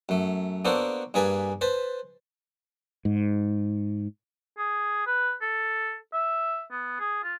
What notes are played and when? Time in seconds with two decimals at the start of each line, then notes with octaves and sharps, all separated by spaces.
0.09 F#2 A3
0.65 A#3 B3 D4 F#4 A4 C5
1.14 G2 A#3 G#4 B4 G#5 A5
1.61 B4 C5 A5
3.05 G#2
4.58 G#4
5.07 B4
5.42 A4
6.13 E5
6.71 B3
7.00 G#4
7.24 F4